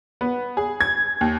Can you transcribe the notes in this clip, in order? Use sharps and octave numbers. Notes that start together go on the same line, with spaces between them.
B3
G#4
G#6
D#2